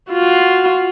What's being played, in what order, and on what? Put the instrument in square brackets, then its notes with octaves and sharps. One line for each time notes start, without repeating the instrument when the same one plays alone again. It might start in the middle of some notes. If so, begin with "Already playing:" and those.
[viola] F4 F#4